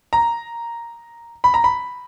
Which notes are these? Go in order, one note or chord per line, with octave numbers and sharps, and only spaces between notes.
A#5
B5
A#5
B5